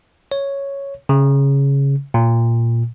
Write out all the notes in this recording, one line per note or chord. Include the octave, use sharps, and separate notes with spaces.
C#5
C#3
A#2